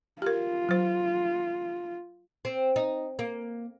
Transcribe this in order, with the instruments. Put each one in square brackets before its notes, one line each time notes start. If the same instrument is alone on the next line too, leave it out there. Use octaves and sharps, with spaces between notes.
[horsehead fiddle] F4 [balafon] G4 A#4
[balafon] F#3 C5
[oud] C4
D#4
A#3